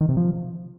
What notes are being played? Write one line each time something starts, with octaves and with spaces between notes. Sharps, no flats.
D#3
C3
F3